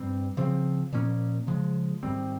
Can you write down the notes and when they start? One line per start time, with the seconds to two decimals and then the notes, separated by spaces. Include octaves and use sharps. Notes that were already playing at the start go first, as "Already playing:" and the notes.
Already playing: G2 G3 C4
0.37 C#3 F3 C4
0.92 A#2 F3 A#3 C#4
1.47 C#3 F3 G#3
2.03 G#2 D#3 G3 C4